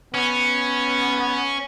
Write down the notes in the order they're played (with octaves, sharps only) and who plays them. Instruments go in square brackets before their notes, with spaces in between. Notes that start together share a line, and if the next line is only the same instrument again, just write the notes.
[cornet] B3 [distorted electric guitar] C#4